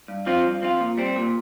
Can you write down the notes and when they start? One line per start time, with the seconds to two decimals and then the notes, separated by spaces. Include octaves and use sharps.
0.08 G2
0.26 F3 C4 F4
0.44 G2
0.62 F3 C4 F4
0.80 A#2
0.98 G3 C4
1.16 A#2